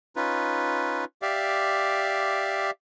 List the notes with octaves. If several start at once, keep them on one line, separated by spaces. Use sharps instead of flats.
C#4 D#4 F4 B4
G4 D5 E5 F5